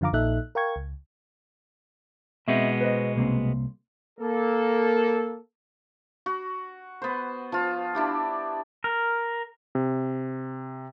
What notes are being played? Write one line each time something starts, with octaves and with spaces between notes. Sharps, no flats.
F#2 D3 F3 F5 A#5 D6
A#1 A#2 D#4 A4 E5 F#6
A#4 F5 G5 C#6 G#6
C#2
B2 G#3 B3 C4 D#5 E5
B4 C5 D#5
C2 A#3 C4
A#3 A4
F#4
B3 C5
F3 F4
D4 E4 G4
A#4
C3